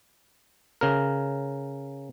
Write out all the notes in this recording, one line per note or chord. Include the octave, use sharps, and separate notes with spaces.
C#3 A#4